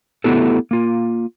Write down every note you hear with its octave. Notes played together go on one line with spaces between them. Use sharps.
A3 B3 E4 F#4 G4 A4
A#3 F4